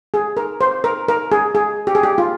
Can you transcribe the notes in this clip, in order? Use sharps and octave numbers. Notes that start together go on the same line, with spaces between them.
G#4
A#4
C5
A#4
A#4
G#4
G#4
G4
G#4
G4
F4